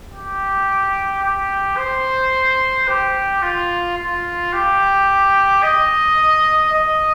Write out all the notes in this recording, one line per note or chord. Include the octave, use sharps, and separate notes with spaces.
G4
G4
C5
G4
F4
F4
G4
D#5
D#5